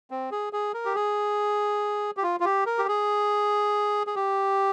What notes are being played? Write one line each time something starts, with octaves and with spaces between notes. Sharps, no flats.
C4
G#4
G#4
A#4
G4
G#4
G4
F4
F4
G4
A#4
G4
G#4
G#4
G4